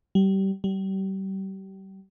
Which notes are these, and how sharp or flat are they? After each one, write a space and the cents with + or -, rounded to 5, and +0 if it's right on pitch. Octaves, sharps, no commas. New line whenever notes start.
G3 -25
G3 -30